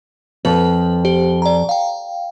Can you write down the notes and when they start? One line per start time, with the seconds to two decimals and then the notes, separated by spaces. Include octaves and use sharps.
0.45 F2 B4
1.05 G4 C5
1.42 D5 A#5
1.69 F5 G5